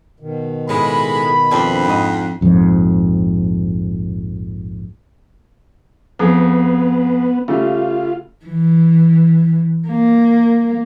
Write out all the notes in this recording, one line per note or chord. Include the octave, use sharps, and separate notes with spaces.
B2 D#3
A2 C#3 G#3 D#4 B5
F2 C4 D4
G#2 D#5
A#1 F2 G#2
F2 B3 G#4
C#3 G3 A3 F4
E3
A#3